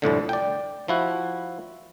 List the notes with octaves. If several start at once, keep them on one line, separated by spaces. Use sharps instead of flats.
C2 F2 A2 D3
D5 G5
F3 E4 F#4